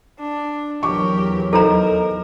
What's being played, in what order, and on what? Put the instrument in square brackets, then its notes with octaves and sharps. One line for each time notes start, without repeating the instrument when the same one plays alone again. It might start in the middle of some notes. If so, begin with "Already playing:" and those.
[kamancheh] D4
[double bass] E2 F#3 [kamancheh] G4 A#4 [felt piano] C#6 D6
[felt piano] D#4 [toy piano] A4 C5 A#5 [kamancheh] A#4